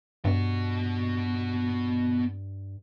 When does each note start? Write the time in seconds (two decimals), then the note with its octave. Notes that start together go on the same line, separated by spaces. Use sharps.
0.25 G2 B3 F#4